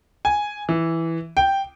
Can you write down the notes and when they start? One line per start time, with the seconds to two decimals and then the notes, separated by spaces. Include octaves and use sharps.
0.25 G#5
0.69 E3
1.37 G5